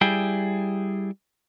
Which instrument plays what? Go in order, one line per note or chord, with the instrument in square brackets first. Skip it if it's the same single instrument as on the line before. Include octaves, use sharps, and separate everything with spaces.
[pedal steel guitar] G3 E4 G#4 G5